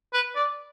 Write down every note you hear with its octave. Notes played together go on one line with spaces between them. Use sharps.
B4
D5